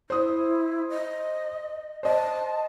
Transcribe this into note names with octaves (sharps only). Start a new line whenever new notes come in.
E4 C5 D#6
D#5
C5 D#5 A5